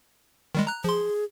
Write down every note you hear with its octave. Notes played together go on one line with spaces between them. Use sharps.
D#3 G3 G#3
A#5 F#6
F3 G#4 C6